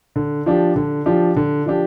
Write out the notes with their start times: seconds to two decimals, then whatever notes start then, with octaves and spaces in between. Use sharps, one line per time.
0.16 D3
0.46 F3 D4 G4
0.76 D3
1.06 F3 D4 G4
1.36 D3
1.66 F3 D4 G4